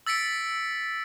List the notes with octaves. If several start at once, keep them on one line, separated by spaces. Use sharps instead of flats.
E6 A6 B6 C#7 D7